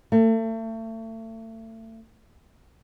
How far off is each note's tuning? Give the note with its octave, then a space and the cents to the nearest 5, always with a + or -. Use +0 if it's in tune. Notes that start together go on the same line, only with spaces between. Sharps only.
A3 +35